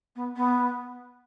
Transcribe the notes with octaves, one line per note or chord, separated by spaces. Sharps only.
B3
B3